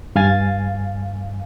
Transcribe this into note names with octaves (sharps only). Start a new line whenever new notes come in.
G2 F5 G#5 A6